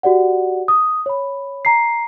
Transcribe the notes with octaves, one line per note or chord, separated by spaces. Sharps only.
F#4 G4 D5 F#5
D#6
C#5 B5
A#5 C7